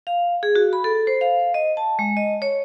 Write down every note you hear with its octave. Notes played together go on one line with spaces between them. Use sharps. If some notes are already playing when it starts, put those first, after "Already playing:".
F5
G#4
F#4
B5
A4
C5
F5
D#5
A5
G#3
D#5
C#5